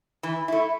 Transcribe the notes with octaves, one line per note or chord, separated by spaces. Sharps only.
E3
A3 E4